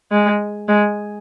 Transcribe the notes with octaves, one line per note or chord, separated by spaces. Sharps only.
G#3
G#3